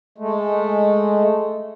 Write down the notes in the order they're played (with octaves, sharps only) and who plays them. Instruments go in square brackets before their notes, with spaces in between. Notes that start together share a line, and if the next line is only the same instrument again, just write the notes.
[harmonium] G#3 A3